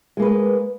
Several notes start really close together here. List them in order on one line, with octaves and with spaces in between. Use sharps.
G#3 A#3 B4